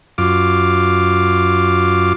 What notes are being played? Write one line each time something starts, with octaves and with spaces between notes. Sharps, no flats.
F#2 F4 D6